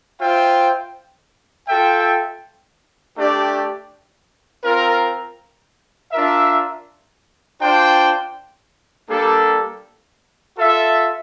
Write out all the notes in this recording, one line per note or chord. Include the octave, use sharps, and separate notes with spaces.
F4 C5 E5 G5
F4 A4 E5 G5
A3 D4 G4 D5
C4 F4 A#4
D4 F4 A#4 E5
D4 F4 C5 G5
G3 A#3 D4 A4
F4 A4 E5